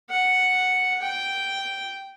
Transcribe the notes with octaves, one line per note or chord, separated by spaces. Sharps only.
F#5
G5